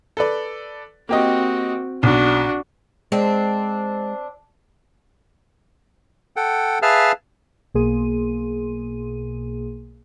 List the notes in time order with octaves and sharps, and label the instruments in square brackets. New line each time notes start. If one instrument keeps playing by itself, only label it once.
[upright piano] A4 B4 D5
[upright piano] A#3 G4 D#5 [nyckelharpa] C4 F#4
[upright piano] B1 [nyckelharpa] D4 F#4
[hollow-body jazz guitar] G#3 [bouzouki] C4 D4
[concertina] A4 F#5 G5
G#4 B4 E5 F5 A5 F6
[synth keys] B1 B2 A#3 G#4 C6 D#7